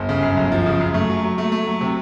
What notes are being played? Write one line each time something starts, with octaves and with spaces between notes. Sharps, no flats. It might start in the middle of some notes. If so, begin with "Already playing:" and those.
Already playing: G1
C#3
F#2
G1
F3
C#3
F#2
A3
F#3
F#3
A3
A3
F#3
C3